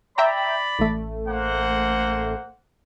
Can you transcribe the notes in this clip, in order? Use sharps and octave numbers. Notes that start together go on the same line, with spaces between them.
D5 E5 G5 A#5 B5
A1 A3
A#3 C5 F#5